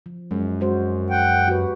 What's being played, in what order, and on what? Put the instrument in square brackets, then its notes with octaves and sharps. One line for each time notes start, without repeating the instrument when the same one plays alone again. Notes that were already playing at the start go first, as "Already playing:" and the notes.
[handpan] F3
[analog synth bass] F#2 [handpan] G#3
[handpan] G#3 F#4 C5
[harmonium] F#5 G5
[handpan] F#4 G4 B4